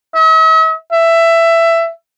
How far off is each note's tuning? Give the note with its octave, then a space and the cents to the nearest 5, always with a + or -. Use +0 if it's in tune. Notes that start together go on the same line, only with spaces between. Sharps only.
E5 -45
E5 +15